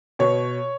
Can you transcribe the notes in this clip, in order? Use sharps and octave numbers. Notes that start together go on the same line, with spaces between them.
B2 C#5